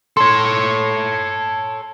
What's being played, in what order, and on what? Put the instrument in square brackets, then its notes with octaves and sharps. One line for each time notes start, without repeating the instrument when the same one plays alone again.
[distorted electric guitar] A4 C#5 [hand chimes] C6